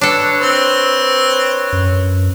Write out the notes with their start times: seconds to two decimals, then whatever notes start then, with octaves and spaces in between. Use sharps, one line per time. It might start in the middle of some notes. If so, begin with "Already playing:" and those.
0.01 D4 A4 B4 C#5
0.41 C4
1.72 F#2